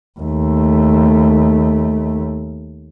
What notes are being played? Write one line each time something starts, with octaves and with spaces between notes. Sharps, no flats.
D#2 A3